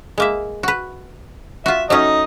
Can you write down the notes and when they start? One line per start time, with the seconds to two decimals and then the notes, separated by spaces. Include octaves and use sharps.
0.18 G#3 A#3 E5
0.63 F#4 B4
1.66 F4 F#4 E5
1.90 F#3 A3 C#4 D#4 D#5